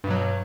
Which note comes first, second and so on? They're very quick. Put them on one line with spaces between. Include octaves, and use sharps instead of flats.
G2 B2 F#3